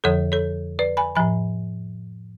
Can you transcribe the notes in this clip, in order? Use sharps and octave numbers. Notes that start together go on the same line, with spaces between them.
F2 D3 F3 A4 C#5
A4 C#5
B4 D5
G#5 B5
A2 F3 G#5 B5